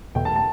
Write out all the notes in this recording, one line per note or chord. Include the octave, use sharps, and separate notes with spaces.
E2 B2 A3 G5
A5
A5